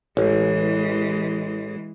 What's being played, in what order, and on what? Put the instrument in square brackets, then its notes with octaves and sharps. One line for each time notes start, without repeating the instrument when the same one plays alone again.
[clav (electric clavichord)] A1 [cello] E3 G#3